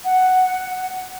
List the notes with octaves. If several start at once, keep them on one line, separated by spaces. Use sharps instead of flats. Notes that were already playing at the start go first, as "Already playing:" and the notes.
F#5